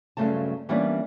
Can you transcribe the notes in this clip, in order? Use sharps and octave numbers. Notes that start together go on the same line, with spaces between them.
G2 C#3 F#3 A3 C4 A5
E3 G3 A#3 B3 C#4 D4